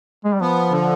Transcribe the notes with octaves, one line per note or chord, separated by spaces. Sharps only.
G#3
G3
F3 B3
D3